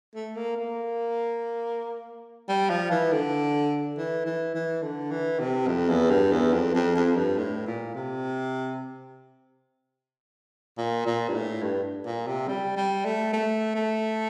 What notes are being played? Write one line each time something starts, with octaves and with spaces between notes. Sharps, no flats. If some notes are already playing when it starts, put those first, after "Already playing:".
A3
A#3
A#3
G3
F3
E3
D3
E3
E3
E3
D3
E3
C3
F2
E2
G2
E2
F2
F2
F2
G2
A2
A#2
C3
A#2
A#2
G2
A2
G2
A#2
C3
G3
G3
A3
A3
A3